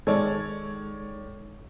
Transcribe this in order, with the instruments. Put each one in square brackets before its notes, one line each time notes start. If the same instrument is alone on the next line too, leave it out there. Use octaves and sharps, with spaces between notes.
[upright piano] D#3 C#5 D5 [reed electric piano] G#3 A4 G#6